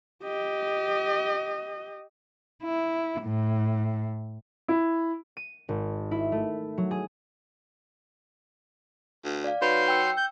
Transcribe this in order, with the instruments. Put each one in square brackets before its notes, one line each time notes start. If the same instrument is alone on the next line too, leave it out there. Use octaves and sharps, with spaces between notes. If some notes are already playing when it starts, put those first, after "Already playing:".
[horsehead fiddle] G4 D#5
[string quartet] E4
A2
[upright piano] E4
[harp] D#7
G#1
E4
A3
F#3
G#4
[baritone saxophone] D2
[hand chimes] D5 F5
[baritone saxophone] F#3 [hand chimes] D#4 B4 B5 [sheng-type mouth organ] C6 G6
[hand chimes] G5 E6
[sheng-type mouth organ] G6